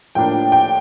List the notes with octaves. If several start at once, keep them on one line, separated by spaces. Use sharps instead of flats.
A2 F3 A#3 D4 G5
G5